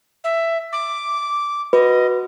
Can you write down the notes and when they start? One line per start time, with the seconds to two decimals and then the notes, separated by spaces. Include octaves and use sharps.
0.24 E5
0.72 D6
1.73 F#4 B4 D#5